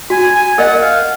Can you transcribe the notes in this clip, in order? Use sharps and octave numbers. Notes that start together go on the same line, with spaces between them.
F#4 G#5
G#5
A#4 D#5 F#5
F5